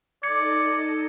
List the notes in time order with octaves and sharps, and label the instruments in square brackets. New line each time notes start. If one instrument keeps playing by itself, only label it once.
[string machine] D#4 A4 D#5 [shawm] D5 [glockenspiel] G#6 C#7